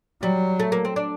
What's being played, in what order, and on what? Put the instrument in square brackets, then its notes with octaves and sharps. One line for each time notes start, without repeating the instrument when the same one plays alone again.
[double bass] F#3 [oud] G3
[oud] A3
A#3
C4
D4